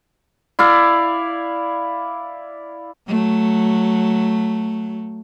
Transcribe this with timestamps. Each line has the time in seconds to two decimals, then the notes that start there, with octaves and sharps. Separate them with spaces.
0.59 E4 D5 F5
3.08 F#3 A3